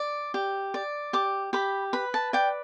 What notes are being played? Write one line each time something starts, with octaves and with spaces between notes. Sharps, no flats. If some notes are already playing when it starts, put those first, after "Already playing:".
Already playing: D5
G4
D5
G4 D6
G4 B5
B4 B5
A5
D5 G5